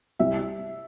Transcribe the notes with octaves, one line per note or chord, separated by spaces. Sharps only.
C2 E5